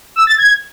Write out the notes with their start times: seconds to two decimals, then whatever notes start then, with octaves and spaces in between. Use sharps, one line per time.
0.16 E6
0.27 A6
0.38 G#6